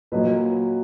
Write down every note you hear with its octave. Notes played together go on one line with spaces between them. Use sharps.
A#2 F#3 A#3 B4 D#5